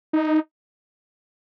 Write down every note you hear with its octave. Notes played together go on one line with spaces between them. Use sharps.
D#4